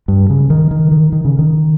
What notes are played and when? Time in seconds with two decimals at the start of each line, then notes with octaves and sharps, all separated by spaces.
0.08 G2
0.30 C#3
0.50 D#3
0.71 D#3
0.91 D#3
1.12 D#3
1.25 C#3
1.39 D#3